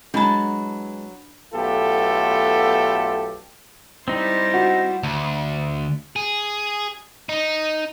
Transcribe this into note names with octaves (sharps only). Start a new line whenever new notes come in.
F#3 G#3 B3 D4 E4 A5 B5
B1 A3 B3 F4 G4 A4
G3 C4 D#4 E4 C5
F#4
D2
G#4
D#4